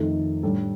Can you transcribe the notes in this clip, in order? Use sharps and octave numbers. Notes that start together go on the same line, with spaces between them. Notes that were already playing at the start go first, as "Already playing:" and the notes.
Already playing: F2 D#3 A3 D#4 A4
A2 G3 D4 A4